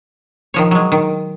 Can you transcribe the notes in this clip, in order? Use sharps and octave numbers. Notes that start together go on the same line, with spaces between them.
D#3 F3 C#5
F#3 G#3
D#3